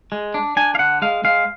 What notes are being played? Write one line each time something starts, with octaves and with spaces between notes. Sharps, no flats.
G#3
D4
D4 G#5
F5
D3 F#5
G#3 F5
G#3 F5